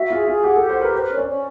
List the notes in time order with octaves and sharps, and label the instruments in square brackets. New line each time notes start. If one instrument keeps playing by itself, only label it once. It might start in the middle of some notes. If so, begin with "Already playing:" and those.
Already playing: [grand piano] F#4 [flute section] E5
[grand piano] F4 [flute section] G#4
[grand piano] F4 [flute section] G#4
[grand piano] G4 [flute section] F#5
[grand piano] A4
[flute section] G4
[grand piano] C5
[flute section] A#4 [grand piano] B4
[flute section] B4 [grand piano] C5
[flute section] C#4
[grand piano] D5
[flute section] C#4